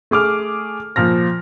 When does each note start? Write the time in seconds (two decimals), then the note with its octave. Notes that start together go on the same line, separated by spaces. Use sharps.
0.11 A3 G#4 D6 F6
0.96 A#2 F3 F6 A#6